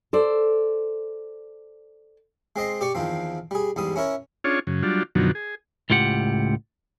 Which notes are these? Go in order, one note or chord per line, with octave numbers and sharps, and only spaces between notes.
A4 C5 D5
G#3 C4 D#5 C6
G4 D5 C#6
E2 D#3 F3 C4
G3 G#4
E2 G#2 G3 D#6
C#4 E4 A#4 C#5
C#4 D4 F4 G#4 C#5
F#2 C#3
F#3 G3 D4 F4
F#2 B2 D3 D#3 F3 F#3
G#4
C#2 A2 F4 G4 F#5